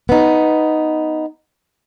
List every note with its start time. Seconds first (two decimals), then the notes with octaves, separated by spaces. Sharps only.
0.09 B3 D#4